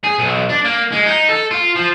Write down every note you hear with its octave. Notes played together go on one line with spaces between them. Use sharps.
G#4
B1
D4
A#3
G#3
D#4
A4
F4
F3